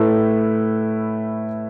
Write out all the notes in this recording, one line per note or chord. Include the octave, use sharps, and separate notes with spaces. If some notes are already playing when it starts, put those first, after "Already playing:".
Already playing: A2 A3 E4 B4